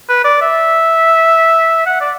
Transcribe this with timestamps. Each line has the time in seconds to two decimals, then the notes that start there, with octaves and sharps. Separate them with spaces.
0.09 B4
0.24 D5
0.41 E5
1.86 F#5
2.00 D5